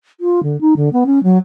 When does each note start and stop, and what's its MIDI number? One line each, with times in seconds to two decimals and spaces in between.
0.20 0.43 65
0.43 0.59 50
0.61 0.74 63
0.76 0.89 50
0.93 1.04 59
1.06 1.22 61
1.23 1.38 54